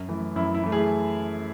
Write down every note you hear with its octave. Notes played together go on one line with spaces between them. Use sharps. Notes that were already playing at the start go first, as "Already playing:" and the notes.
Already playing: F#2
E3 A3
F#2 E4
E4
E3 A3
G#4